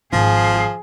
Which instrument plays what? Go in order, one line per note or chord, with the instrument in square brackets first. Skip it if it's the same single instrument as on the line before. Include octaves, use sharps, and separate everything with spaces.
[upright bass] G#1 [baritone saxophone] F3 [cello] G#4